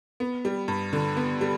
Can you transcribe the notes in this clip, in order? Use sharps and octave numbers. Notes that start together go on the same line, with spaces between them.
B3
G3
G2
D3
B3
G3